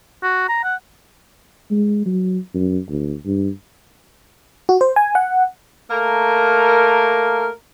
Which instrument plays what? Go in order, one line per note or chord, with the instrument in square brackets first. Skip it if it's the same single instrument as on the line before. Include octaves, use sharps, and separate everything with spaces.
[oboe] F#4
A#5
F#5
[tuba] G#3
F#3
F#2
D2
G2
[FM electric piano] F#4
C5
G#5
F#5
[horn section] A3 A#3 A#4